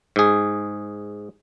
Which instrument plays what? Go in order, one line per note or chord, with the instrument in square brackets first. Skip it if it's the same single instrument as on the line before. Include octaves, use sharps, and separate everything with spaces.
[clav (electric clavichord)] G#2 G#4